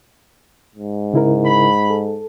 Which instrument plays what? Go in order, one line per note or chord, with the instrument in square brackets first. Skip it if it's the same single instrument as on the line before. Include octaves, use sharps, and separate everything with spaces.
[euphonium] G#2
[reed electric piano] C#3 E4 A#4
[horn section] B5
[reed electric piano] A4